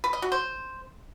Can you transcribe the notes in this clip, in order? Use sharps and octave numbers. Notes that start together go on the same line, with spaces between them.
B4
D#5
F#4
C5